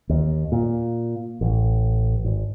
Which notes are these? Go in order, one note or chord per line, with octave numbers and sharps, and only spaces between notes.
D#2
A#2
A1
G#1